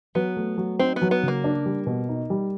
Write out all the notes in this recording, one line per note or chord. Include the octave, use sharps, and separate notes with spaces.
F#3 B3
A3
F#3
C4 D#4
B3
F#3
B3
C#3 A#3
D4
G3
B2
D#4
G3